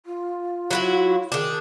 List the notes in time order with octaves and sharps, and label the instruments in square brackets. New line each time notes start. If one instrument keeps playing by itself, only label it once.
[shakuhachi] F4
[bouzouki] F#3 E4 F#4
[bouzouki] D#3 D4 [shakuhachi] G#4